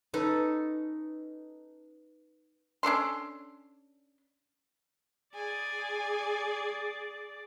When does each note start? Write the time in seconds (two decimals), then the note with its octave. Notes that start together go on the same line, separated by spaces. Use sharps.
0.14 C#4 D#4 A4 B4
2.83 C#4 D4 A4 C6
5.35 G#4 D5 G#5